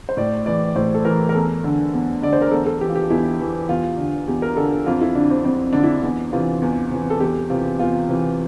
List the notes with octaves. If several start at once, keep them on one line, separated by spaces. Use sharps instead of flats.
C5
A2 D5
E3 D5
A2 C5
A4
E3 A#4
A#4
E2 A4
D3
E2
D3 D5
C5
A#4
E2 A4
A4
E3 G4
F4
G4
E2 E4
E3
E2 F4
D3
E2 G4
A#4
D3 A4
F2 F4
E4
D3 D4
C4
F2 C4
D3 D4
E4
E2
C3 E3 F4
E2
C3 E3
A4
E2 G4
C3 E3 F4
E2 F4
C3 E3